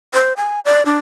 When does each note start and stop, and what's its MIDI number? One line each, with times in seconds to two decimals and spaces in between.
0.14 0.33 72
0.37 0.60 80
0.65 0.83 74
0.86 0.98 62